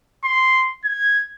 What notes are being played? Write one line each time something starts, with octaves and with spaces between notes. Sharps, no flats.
C6
G#6